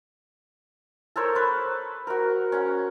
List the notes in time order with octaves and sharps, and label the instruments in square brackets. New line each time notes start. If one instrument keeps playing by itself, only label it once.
[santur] A4 A#4 C5 C#5
B4 C5
F#4 A#4
C#4 F#5